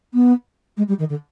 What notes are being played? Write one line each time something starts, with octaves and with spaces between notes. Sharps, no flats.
B3
G#3
G3
D#3
D3